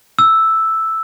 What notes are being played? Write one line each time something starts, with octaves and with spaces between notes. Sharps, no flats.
E6